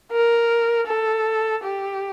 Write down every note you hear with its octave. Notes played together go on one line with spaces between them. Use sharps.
A#4
A4
G4